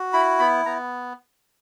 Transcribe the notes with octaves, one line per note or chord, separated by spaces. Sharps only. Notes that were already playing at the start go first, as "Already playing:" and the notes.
Already playing: F#4
E4 B5
B3 B5
B3 A#5